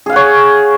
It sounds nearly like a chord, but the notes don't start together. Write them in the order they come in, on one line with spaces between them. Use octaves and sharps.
G#4 F5 F#5 C#5